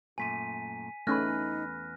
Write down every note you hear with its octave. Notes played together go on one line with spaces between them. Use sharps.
F#2 A#2 A3 G#5 B6 D#7
E2 A3 C#4 D#4 B4 F6 F#6 A#6